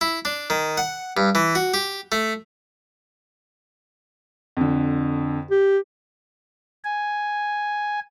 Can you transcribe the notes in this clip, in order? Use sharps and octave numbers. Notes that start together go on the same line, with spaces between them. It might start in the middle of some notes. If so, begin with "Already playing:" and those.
E4
D4
D#3
F#5
G2
E3
F#4
G4
A3
F2 D3
G4
G#5